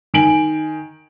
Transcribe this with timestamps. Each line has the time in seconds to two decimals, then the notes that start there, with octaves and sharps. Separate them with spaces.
0.14 D#3 G#5 D7 F#7